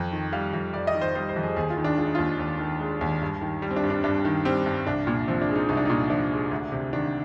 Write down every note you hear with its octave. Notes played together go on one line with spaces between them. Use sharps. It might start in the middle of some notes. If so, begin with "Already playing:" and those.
Already playing: F2 G5
D#3
G3 F5
F2
F2 D5
D#5
D#3
C5
G3 C5
C5
F2
G#4
D#2 G#4
F4
D#3
D4
G#3 F4
D#4
D#2 F4
D#2
D#3
G#3
D#2
G2
D#3
G3
C4
D4
G2
D4
G2 D4
D#3
G3 C4
G2
C2 D4
A#2
F3 C4
D4
G#3
D#4
C2 D#4
D4
A#2 D#4
F3 D4
G#3
D2
C3
D#3 D4